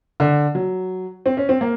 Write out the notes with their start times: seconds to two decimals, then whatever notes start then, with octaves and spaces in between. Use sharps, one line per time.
0.20 D3
0.55 F#3
1.26 C4
1.37 C#4
1.49 C4
1.61 A#3